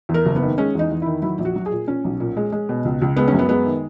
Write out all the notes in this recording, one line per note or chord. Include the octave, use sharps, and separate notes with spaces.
E2
A#4
F#1
B3
D#3
G#3 C#4
E2 D#4
E2
D#3 E4
F#3 E4
A#1
F#4
F#3
G#4
A#2
A#2 C#4
B1
A#2
G#3
G#3
B2
C#2
C#2
G#3 B3
C#4
F#2
B3
G#3 B3
D#3